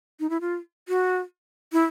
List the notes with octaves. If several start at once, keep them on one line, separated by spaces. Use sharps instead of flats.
D#4
E4
F4
F#4
E4